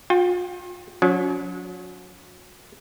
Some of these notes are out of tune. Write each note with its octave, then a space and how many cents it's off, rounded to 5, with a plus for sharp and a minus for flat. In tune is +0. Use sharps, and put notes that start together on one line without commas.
F4 +40 G5 +0
F#3 -35 C#4 +40